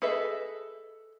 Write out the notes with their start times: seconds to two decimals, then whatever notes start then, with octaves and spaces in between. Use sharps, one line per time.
0.02 G#4 A4 B4 D#5 E5